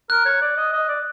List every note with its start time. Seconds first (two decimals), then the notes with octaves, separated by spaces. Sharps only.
0.10 A#4 F#6
0.26 C#5
0.42 D5
0.57 D#5
0.73 D#5
0.88 D5